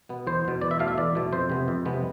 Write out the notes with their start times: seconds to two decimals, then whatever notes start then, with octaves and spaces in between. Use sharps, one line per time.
0.09 B2 B3
0.27 E2 C5
0.45 B2 B3
0.61 E2 D5
0.71 E5
0.79 B2 A3 F5
0.88 E5
0.98 E2 D5
1.15 B2 A3
1.32 F2 C5
1.50 C3 G#3 B3
1.68 F2
1.85 C3 G#3 B3